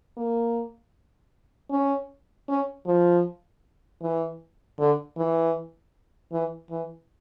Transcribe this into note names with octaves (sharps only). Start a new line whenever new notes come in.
A#3
C#4
C#4
F3
E3
D3
E3
E3
E3